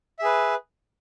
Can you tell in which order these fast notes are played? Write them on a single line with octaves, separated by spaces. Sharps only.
E5 G#4 B4